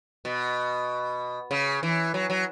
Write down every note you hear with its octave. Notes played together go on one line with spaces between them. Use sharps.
B2
C#3
E3
F#3
F#3